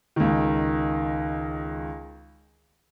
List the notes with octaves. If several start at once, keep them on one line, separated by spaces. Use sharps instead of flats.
C#2 D#3